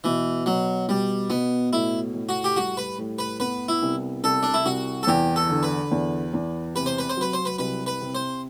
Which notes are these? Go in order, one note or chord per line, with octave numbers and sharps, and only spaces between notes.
B2 E3
B2 F#3
B2 G3
B2 B3
A2 E4
A2
F#4
G4
G3 F#4
B4
A2
B4
B3 B4
E4
C2
C2 A4
D4
E4
C2 F#4
A4
E2 G4
A4
D3
B4
E2
E2
C3 B4
C5
B4
C5
F#3 B4
C5
B4
C2 B4
B4
C3
C5